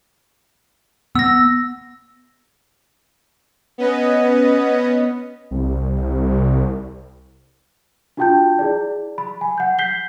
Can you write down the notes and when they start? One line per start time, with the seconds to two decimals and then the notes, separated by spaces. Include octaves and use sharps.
1.15 B3 E6 A#6
3.78 B3 C#4 B4 D#5
5.51 C2
8.17 D4 F4 F#4 G5 A5 G6
8.59 E4 G#4 D5
9.18 B5
9.41 G#5
9.58 F#5 G6
9.79 G6 B6 C7 G7